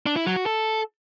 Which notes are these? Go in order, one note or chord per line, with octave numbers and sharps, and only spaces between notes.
D4
E4
F#3
F#4
A4